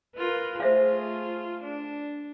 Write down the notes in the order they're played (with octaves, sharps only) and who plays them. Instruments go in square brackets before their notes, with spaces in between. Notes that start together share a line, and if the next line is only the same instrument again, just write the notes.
[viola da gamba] F4 A#4 B4
[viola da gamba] A3 F4 G#4 [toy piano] C5 E5 F5
[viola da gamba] D4